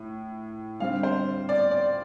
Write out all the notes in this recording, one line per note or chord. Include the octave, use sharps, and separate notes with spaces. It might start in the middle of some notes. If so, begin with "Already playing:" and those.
Already playing: A2
D3 G3 C4 F5
C5
D5
D5